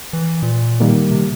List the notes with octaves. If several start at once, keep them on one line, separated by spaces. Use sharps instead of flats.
E3
A#2
D#3 G3 A#3
C3